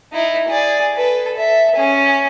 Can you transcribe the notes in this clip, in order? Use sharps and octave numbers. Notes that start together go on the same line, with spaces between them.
D#4 E4
G#4 D5
A4 B4
A4 E5
C#4 G#4